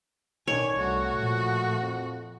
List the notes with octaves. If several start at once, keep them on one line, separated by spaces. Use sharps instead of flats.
B2 D#3 D4 C#5 G#5
C2 A3 F#4
A#2 F3
F2